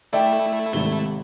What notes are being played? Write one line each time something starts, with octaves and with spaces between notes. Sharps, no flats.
A3 E4 D5 E5 G5
G#1 C3 G7